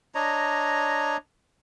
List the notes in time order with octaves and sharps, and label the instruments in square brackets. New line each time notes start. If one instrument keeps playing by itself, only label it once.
[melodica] D4 C#5 D#5 A#5